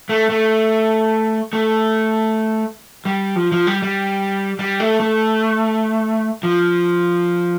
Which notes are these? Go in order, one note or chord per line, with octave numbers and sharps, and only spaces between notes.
A3
A3
A3
G3
F3
F3
G3
G3
G3
A3
A3
F3